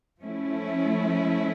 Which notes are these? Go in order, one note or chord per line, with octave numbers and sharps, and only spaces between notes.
F3 A3 C#4 E4